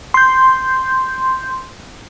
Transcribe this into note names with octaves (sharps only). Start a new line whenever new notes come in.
C6 G6